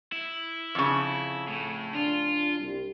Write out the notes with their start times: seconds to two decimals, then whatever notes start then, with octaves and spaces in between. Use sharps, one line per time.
0.12 E4
0.75 F2 C#3
1.48 A2
1.94 D4 F4
2.60 C2 G3